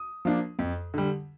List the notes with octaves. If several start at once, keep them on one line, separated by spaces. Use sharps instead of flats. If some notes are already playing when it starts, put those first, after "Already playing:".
Already playing: D#6
F3 A#3 D4
F2
D3 G3